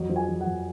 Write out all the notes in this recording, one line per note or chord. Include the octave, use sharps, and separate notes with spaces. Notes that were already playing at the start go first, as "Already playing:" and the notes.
Already playing: F2 F#3
F3
G#5
F3
F#5
F2